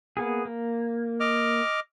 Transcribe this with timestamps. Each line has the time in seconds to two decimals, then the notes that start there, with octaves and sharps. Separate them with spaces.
0.17 A#3 B3 G#4
0.45 A#3
1.20 D#5 D6 F6